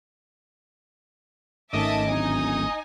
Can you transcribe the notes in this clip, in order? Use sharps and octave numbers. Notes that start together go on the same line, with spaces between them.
G#1 D#3 A3 C#4 D#5 E5 A5 D6
D1 D#4 G#5